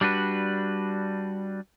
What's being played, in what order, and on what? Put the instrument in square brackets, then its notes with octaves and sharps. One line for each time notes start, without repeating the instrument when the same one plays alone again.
[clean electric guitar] G3 D4 F#4 B4